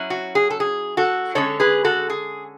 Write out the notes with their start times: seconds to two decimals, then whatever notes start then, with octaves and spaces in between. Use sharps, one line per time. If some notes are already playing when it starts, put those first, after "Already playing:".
Already playing: F#3 C#4 E4
0.10 F#4
0.35 G#4
0.50 A4
0.60 G#4
0.97 F#4 A4
1.35 D3 G#3 C#4 A4 C#5
1.60 G#4 B4
1.84 F#4 A4
2.10 G#4